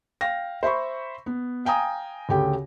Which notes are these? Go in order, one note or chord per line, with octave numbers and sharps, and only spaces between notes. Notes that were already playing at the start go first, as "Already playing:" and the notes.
F5 G5 A#6
C5 E5 B5 C#6
B3
F5 G5 G#5 A#5 D#6
D2 C#3 G4 A4 G5